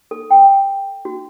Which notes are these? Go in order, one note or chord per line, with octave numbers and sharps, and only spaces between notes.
A4
G5
F#4